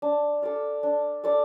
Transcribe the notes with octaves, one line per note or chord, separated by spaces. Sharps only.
D4
A4 D5 F5
D4
A4 D5 F5